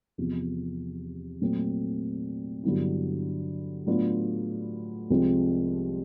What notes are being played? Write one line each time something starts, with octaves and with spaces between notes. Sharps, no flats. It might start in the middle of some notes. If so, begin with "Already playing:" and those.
E2 C3 F3
A#2 F#3 A3 C4
G2 D3 F#3 B3 E4
A2 F#3 B3 D4 F4
C2 C3 F3 G#3 C4